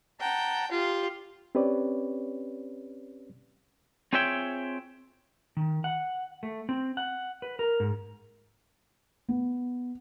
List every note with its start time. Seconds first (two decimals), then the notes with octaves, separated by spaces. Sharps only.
0.20 F#5 G5 A5 A#5
0.71 F4 G4
1.55 C4 C#4 G4 B4 C#5 D5
4.13 C4 F4 G#4 C#5 E5 G5
5.57 D#3
5.84 F#5
6.43 A3
6.69 C4
6.97 F#5
7.42 B4
7.59 A#4
7.80 G#2
9.29 B3